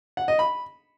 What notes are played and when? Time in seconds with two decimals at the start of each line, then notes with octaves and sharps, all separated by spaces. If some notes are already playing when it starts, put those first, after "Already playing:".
0.17 F#5
0.28 D#5
0.39 B5